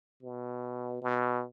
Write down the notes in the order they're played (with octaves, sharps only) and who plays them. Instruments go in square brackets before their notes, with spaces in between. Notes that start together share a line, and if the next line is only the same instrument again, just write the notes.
[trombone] B2
B2